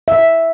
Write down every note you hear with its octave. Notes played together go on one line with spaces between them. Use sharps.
E5